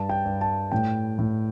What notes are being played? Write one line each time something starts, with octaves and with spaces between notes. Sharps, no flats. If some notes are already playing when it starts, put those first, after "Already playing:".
Already playing: G2 A5
G5
G2
A5
A2 G5
A2